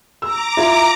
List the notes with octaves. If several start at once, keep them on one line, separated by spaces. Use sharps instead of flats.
A#5 D6 E6
E4 F4